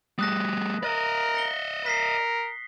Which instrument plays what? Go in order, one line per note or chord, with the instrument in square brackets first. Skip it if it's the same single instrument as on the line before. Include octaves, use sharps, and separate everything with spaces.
[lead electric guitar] G3 A3 [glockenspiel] D#6 F#6 A#6
[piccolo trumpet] A#4 [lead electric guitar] D5 D#5
[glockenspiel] A#6 C#7 G7
[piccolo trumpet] A#4 [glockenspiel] B6 C7